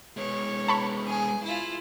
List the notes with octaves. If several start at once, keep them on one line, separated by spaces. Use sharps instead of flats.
G#3 B3 C#5
A5 B5 C#6
G#4
E4 F4